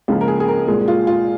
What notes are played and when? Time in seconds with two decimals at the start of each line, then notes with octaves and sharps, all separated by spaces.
0.08 C#2 C#3 F3 A#3 F4
0.21 A#4
0.28 G#4
0.40 G#4
0.48 A#4
0.67 C2 A#2 G#3 G#4
0.88 F4
1.07 F4